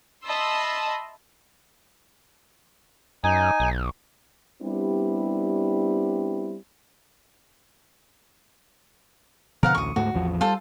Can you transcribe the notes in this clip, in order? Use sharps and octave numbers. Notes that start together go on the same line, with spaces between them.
D#5 E5 A5 B5 C6 E6
F#2 D#4 G#5
B1
G3 B3 C4 D4 E4 G4
B2 D3 F3 A#4 F5 F#5
A1 D2 C#6 D#6
D2 G#2 A3 F#4
A1 E2 F3
G3 F4 A4 C5